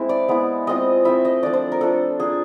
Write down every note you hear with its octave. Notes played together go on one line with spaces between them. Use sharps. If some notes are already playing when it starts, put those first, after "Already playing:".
Already playing: G#3 C4 E4
D5
G#3 B3 E4
G#3 C4 F4 D#5
A3 C4 E4 E5
D#5
F3 A3 D4 D5
C5
A#4
A3 D4 F4 A4
A#3 D4 F4 G#4